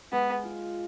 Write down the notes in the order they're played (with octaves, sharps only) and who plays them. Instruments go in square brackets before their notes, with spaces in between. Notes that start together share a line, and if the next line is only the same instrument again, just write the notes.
[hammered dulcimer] G#3 [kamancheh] B3
[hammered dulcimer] F4